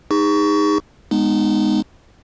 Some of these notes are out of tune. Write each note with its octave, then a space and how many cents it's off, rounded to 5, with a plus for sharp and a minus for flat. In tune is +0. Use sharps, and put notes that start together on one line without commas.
D#4 +0 G#4 -35 C#6 +25
G#3 -10 B3 +0 D#4 -25